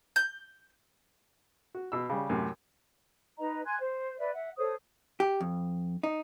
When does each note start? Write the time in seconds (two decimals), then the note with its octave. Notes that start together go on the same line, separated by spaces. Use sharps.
0.16 G6
1.75 F#4
1.92 B2 E6
2.10 C#3 G3
2.30 F#2 A2 C3
3.38 D#4 B4 D#5 A#5
3.65 G#5 C6 F#6 G#6
3.79 C5
4.18 B4 D5 E5
4.34 E5 F#5
4.57 A4 C5 C#5 D#6
5.20 G4
5.41 F2
6.03 D#4